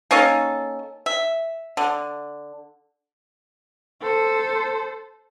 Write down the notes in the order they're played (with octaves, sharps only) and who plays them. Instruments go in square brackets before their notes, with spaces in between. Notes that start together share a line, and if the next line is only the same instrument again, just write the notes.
[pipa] A#3 C#4 D#4 A4
E5
D3
[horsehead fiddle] A4 C5